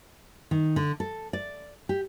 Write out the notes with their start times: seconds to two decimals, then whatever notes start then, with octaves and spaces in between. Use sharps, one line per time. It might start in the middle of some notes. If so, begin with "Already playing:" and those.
0.51 D#3
0.76 D3
1.00 A4
1.33 D5
1.89 G4